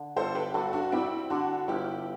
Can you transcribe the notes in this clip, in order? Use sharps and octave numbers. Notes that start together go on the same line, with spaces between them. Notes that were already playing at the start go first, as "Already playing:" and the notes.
Already playing: D3
G1 A4 C5
G4 B4
G2 F#4 A4
D4 F#4
G3 C4 E4
D3 D4 F#4
G1 E4 G4